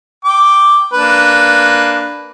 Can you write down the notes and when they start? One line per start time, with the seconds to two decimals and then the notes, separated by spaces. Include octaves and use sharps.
0.25 G5 D6
0.93 A#3 D4 B4